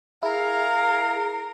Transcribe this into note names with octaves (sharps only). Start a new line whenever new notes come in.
E4 G#4 A#4 F5